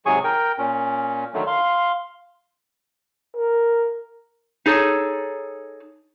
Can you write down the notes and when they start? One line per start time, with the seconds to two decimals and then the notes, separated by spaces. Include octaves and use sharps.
0.06 G#2 C3 F#3 G#4 G#5 C#6
0.24 A#4 G5
0.58 A#2 C#4
1.34 D3 D#3 F#3 A3
1.47 F5 C6
3.37 A#4
4.66 D#4 G#4 A4 C#5